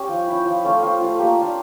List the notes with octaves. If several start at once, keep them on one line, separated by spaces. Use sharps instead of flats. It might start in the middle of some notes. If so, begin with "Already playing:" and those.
Already playing: C#4 G4
F3
C#4 E4
F3
A3 C#4 F4
F3 F4
A3 C#4 F4
A#3 G4
D4 F4